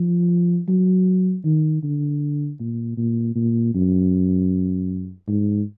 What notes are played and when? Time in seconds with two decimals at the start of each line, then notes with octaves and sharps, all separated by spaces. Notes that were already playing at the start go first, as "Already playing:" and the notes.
Already playing: F3
0.68 F#3
1.44 D#3
1.83 D3
2.60 A#2
2.97 A#2
3.35 A#2
3.74 F#2
5.28 G#2